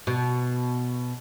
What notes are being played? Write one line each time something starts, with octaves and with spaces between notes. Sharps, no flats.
B2